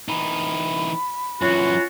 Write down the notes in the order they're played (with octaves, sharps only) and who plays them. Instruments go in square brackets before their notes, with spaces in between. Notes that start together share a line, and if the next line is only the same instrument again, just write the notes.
[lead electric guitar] E3 D#4 [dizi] B5
[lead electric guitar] F#2 E3 [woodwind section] C#4 F4 F#4